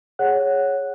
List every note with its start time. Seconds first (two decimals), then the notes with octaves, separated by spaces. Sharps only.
0.19 G#4 C#5 F#5 F#6